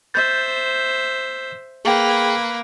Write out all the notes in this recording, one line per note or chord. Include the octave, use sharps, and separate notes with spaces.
C5 E5 G6 A6
A#3 G#4 B4 G5